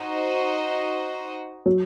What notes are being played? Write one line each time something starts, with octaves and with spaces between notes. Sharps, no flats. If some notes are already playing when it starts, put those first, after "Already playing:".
Already playing: D#4 F#4 C5 D#5
F#3